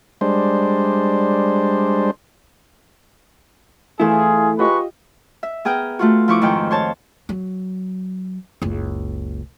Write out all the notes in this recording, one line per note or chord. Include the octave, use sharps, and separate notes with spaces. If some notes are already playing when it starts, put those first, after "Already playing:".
G3 G#3 D4 C5
E3 A3 E4 F4 G#4 A4
G#3 F4 G4 B4 D#5 C#6
E5
B3 G#4 A#4 G5
A3 F4 F#4
F3 E4 C#6 D6
F2 G#2 D#3 F3 G5
C5 C#5 A5
F#3
F#1 C#2